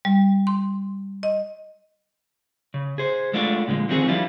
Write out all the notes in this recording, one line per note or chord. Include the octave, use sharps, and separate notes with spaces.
G3
C6
D#5
C#3
G#4 C5
G#3 A3 D4 F4 F#4
A#2 D3 F3 G#3
D3 D#3 F3 C4 F#4 G#4
F3 G3 D4 E4 F4